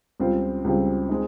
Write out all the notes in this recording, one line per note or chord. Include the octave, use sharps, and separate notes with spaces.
C#2 C#3 G3 C4 F4
C#2 C#3 G3 C4 F4
G#3 C4 D#4